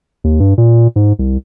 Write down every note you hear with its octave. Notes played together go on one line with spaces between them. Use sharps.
D#2
G2
A#2
G#2
C2